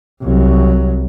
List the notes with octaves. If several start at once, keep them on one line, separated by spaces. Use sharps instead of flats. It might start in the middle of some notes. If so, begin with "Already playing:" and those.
C2 F#3